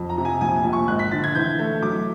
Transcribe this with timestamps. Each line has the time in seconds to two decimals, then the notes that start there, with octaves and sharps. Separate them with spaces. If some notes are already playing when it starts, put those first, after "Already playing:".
Already playing: F2
0.09 A#5
0.18 C3
0.25 G#5
0.41 A#1 G#5
0.56 G#5
0.64 A#1
0.73 C#6
0.88 G#1 F#6
0.99 B6
1.12 D3 A6
1.24 G#6
1.35 E3 G6
1.59 A3
1.82 F#3 D6